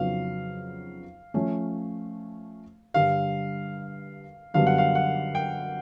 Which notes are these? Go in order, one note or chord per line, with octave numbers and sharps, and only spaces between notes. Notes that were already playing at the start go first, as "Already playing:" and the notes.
Already playing: F2 C#3 F#3 B3 D#4 F5
F3 A3 C#4
G2 D3 G3 F5
F#2 D3 G3 B3 F5
F#5
F5
F#5
G5